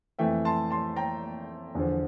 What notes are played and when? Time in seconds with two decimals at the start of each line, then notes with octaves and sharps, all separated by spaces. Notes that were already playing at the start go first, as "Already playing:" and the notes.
0.19 F2 E3 A3 E5 G5
0.45 A5 C6
0.71 A5 C6
0.96 G5 A#5
1.75 E2 D3 F3